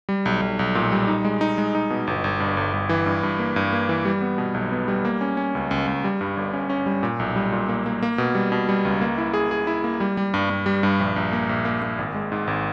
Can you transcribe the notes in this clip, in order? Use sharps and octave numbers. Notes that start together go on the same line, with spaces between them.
G3
B1
B1
B1
A#2
G3
D#4
G#3
D#4
G#3
D#4
B2
G1
G1
G2
G1
G1
E3
G2
G2
A#3
G2
A#3
E3
G3
B3
B2
B1
B3
G3
A#3
C#4
C#4
C#2
C#2
C#2
G3
G2
G1
C#4
C#4
G3
A#2
B1
G3
A#2
A#3
A#3
A#3
B2
G3
B2
G3
C#2
A#3
E4
G#4
G#4
E4
A#3
G3
G3
G2
G2
G3
G2
A#1
A#1
A#3
A#1
A#3
A#3
G#1
G#3
G#2
G#1